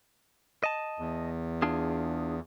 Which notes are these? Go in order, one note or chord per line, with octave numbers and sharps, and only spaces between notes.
D#5 A5
E2
D4 F4 G#4